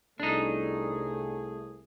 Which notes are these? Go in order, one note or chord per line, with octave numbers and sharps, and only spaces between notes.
C2 A3 D4 D#4 G#4